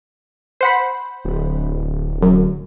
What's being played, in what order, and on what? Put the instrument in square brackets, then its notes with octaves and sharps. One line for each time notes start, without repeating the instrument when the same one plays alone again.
[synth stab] C5 F#5 B5
[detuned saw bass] D1
[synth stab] F#2